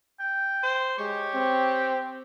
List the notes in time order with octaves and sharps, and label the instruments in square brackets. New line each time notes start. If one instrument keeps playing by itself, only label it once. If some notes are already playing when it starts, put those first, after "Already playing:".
[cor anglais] G5
[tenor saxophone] C5
[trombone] G#3 [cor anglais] G4 [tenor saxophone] C#5
[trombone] C4